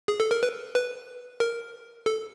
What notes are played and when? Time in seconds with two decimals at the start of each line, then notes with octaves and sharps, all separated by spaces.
0.08 G#4
0.20 A4
0.31 A#4
0.43 B4
0.75 B4
1.40 A#4
2.06 A4